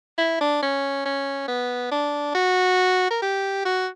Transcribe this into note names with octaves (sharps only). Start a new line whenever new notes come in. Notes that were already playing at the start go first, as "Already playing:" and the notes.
E4
D4
C#4
C#4
B3
D4
F#4
A#4
G4
F#4